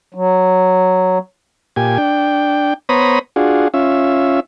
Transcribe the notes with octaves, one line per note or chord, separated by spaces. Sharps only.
F#3
A#2 G4 G#5
D4 G5
B3 C5 C#5 A#5 B5 D#6
D4 F4 F#4 G#4
C#4 F4 E5